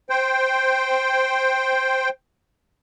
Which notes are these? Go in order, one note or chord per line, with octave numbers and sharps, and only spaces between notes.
C5 G5